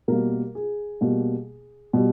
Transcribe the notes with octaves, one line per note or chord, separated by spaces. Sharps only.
B2 G3 A#3 A#4
G#4
B2 G3 A#3
B2 G3